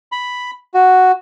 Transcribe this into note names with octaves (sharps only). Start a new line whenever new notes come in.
B5
F#4